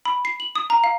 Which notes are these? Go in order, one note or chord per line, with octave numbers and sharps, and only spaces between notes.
B5
C7
F#7
D#6
A#5
F5